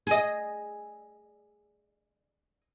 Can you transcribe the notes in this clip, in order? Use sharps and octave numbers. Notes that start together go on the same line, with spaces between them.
G#4 D#5